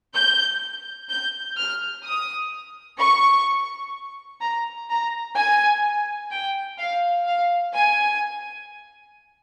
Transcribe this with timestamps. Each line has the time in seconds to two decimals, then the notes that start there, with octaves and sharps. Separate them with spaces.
0.14 G6
1.10 G6
1.57 F6
2.04 D#6
2.99 C#6
4.41 A#5
4.89 A#5
5.37 G#5
6.31 G5
6.79 F5
7.26 F5
7.74 G#5